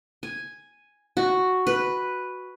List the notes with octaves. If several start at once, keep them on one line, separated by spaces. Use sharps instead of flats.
G#5
F#4
B4